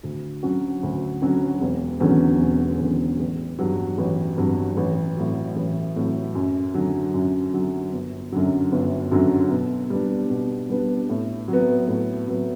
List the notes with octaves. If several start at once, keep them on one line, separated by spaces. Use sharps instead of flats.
D2
D3 F#3 C#4 F#4
D2
D3 F#3 C#4 F#4
E1
E2 D3 F#3 C#4
E1
E2 D3 F#3 C#4
A1
G2 F#3
A1
G2 F#3
A1
A2 F#3
A1
A2 F#3
F#2
D3 F#3
F#2
D3 F#3
G1
F#2 D3 F#3
G1
F#2 D3 F#3
B2
G3 B3 D4
B2
G3 B3 D4
A2
F#3 B3
A2
F#3 B3